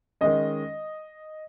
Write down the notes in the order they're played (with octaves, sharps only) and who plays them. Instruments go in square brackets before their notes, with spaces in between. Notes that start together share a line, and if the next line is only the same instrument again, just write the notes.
[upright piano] D#3 G#3 C#4 D#5